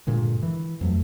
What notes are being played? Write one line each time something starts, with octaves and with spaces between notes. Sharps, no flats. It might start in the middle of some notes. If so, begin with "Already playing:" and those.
G2 A#2 D3 G#3
E3
F2 F#3 A3